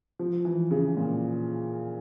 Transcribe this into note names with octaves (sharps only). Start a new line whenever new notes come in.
F3
E3
C#3
A#2